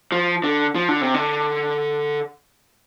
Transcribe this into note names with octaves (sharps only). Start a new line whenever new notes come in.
F3
D3
F3
D3
C3
D3